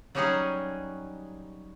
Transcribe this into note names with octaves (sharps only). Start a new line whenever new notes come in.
F#3 G3 C#4 D#4 F#4 G#4